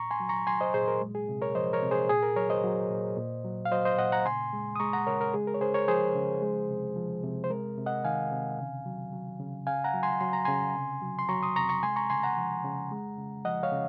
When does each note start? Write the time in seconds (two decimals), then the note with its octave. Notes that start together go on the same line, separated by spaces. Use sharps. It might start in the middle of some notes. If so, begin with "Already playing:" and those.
Already playing: A#2 A#5 C#6
0.11 G#5 C6
0.20 F#3
0.29 A#5 C#6
0.47 F#3 G#5 C6
0.60 C5 D#5
0.74 A#2 G#4 C5
0.88 A#4
1.01 G#3
1.15 G#4
1.28 C3
1.42 A#4 C#5
1.55 F3 C5 D#5
1.73 A#4 C#5
1.82 C3
1.91 G#4 C5
2.09 A#2 G#4
2.23 A#4
2.36 F#3 A#4 C#5
2.50 C5 D#5
2.64 F#3
2.90 A#2
3.17 A#2
3.45 F#3
3.65 F5
3.72 F#3 C5 D#5
3.85 C5 D#5
3.98 A#2 D#5 F#5
4.12 F#5 A#5
4.26 C#3 G#5 C6
4.53 G#3
4.76 D#6
4.80 G#3 A#5 C#6
4.93 F#5 A#5
5.07 C#3 A#4 C#5
5.21 A#4
5.34 G#3 G#4
5.47 A#4
5.54 C#5
5.60 C#3 G#4 C5
5.74 A#4 C#5
5.88 F3 G#4 C5
6.15 C#3
6.42 G#3
6.69 C3
6.96 F3
7.24 C3
7.44 C5
7.50 G#3 A#4
7.78 C3
7.86 D#5 F#5
8.04 D#3 F5 G#5
8.31 C3
8.59 C#3
8.86 F#3
9.13 F#3
9.39 C#3
9.67 C#3 F5 G#5
9.84 F#5 A#5
9.94 F#3
10.03 G#5 C6
10.20 F#3 C6
10.33 A#5
10.45 C#3 G#5 C6
10.75 C3
11.02 F#3
11.19 C6
11.29 F#3 A#5 C#6
11.42 C6 D#6
11.56 C3 A#5 C#6
11.69 A#5 C#6
11.83 G#3 G#5 C6
11.96 A#5 C#6
12.10 C#3 G#5 C6
12.23 F#5 A#5
12.37 F3
12.64 C#3
12.91 G#3
13.18 C#3
13.45 F3 D#5 F#5
13.63 C#5 F5
13.72 C#3